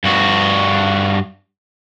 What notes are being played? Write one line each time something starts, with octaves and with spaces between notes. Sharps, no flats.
G2 F#4